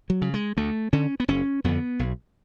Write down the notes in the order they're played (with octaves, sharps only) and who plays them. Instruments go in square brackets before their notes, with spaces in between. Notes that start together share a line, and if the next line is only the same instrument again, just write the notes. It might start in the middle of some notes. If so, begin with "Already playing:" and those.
[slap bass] F#3
C#3
G#3
D2 A3
D3 C#4
B3
F#1 C#4
F2 D3 B3
B1